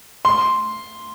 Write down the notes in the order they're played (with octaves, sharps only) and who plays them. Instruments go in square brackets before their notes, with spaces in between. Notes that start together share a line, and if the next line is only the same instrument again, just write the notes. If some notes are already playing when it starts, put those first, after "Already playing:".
[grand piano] C6